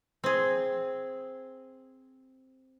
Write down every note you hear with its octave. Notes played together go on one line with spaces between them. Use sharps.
C4 G#4